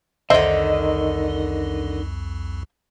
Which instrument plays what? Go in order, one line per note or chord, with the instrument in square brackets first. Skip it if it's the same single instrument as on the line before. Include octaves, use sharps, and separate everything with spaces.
[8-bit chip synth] C2 F2 [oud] D3 D#3 [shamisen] C5 E5 [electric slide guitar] D#5